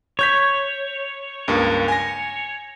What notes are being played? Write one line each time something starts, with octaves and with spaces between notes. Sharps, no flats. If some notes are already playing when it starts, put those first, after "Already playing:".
C#5 C#6 G6 B6
C#2 G2 A#3
G#5 A#6